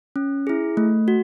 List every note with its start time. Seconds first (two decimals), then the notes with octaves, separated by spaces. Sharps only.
0.16 C#4
0.47 E4 G#4
0.77 A3
1.08 F#4